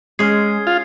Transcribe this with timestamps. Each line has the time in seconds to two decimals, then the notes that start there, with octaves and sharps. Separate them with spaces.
0.19 G#3 C#4 G#4 F6 G#6 C7
0.67 F4